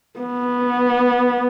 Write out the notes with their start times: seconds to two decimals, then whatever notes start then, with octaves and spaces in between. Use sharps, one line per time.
0.19 B3